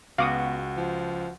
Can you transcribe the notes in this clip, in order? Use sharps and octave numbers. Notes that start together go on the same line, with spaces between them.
C#2 B3 F#4 F5 D6 D#6
F3